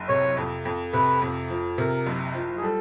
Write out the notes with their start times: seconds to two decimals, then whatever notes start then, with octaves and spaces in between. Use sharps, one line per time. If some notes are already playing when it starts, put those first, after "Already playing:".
Already playing: F#1
0.09 C3 C#5
0.37 F2
0.65 F2
0.93 C3 B4
1.22 F2
1.50 F3
1.78 C3 A#4
2.06 F#1
2.35 F3
2.57 G#4
2.62 G3 A4